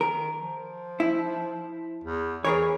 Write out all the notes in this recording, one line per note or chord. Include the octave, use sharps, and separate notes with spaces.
D#3 A#4
F3
E4
E2
E3 G#4 A#4 C#5